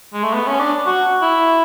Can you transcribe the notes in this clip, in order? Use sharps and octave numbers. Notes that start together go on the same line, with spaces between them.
G#3
A3
B3
C#4
D4
F#4
E4